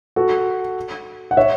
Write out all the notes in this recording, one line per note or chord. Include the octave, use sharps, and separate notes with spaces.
F#4 A4
F#5
C#5 E5